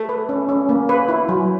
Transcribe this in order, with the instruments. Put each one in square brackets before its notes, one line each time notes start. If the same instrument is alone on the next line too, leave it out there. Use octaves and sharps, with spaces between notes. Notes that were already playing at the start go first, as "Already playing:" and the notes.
Already playing: [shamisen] A3
[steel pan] B4
C#4
C#4
A#3
B4
E4
F#3